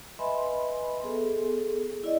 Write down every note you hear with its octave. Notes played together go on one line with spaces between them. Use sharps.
B4 D#5 E5 G#5 B5 C6
B3 G#4 A4
E4 D5 D#5